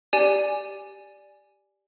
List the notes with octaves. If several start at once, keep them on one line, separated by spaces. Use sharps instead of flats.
G4 D5 G#5